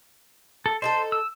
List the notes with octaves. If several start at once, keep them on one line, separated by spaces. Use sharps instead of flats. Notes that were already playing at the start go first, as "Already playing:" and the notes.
A4
D#4 G#4 A4 C5
E6